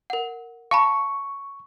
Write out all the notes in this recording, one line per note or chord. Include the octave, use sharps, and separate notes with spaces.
A#4 F#5
F5 A5 B5 C#6